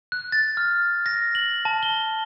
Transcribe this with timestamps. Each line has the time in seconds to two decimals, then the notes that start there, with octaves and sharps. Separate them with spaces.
0.12 F#6
0.32 A6
0.57 F6
1.06 A#6
1.35 F#7
1.65 A5
1.83 G7